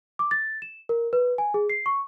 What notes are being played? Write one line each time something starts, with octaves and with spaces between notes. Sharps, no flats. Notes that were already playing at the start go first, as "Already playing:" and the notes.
D6
A6
E7
A#4
B4
G#5
G#4
C7
C#6